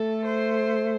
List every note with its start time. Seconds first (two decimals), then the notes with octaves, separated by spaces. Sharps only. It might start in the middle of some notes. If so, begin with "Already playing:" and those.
Already playing: A3 A4
0.25 C5